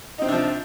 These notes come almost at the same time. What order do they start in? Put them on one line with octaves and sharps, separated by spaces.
D#4 C4 C3 D4 F3